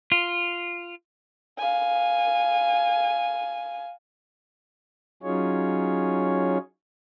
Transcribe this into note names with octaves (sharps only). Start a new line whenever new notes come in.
F4
F5 G#5
F#3 C#4 D#4 F4 G#4 C#5